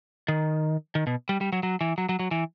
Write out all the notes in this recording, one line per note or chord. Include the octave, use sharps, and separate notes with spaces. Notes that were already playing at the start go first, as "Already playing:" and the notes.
D#3
D#3
B2
G3
G3
F#3
F#3
E3
F#3
F#3
F#3
E3